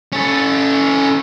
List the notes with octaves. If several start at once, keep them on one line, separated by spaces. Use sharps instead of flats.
C#4 A4